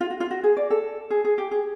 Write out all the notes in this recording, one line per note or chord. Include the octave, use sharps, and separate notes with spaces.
F4
F#4
F4
F#4
G#4
D5
A4
G#4
G#4
G4
G#4